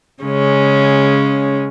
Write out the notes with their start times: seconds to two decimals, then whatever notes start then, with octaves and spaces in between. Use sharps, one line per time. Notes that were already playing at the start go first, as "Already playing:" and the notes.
0.23 C#3 G#3 C#4